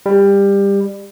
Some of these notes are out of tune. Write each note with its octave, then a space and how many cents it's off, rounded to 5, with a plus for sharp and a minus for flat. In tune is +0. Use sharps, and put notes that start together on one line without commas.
G3 +20